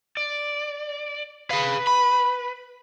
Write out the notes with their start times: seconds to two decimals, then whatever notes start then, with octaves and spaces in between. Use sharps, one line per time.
0.17 D5
1.51 G#4 B4 F5
1.87 B5